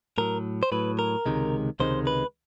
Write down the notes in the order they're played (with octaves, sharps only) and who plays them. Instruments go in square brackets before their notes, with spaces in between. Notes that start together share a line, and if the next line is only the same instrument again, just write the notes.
[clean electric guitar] A2 F#3 A#4
C5
A2 F#3 B4
A#4
C#2 C3 D#3 G#3
C#2 C3 D#3 G#3 C5
B4